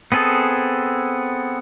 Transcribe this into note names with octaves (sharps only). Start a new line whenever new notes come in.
B3 C4 G#4 A4